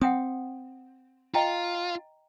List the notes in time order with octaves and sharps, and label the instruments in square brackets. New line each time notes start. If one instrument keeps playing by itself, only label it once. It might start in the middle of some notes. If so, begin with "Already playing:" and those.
[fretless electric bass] C4 [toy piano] F#5 G5 D#6
[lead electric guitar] F4 [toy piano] D#5 G5 A#5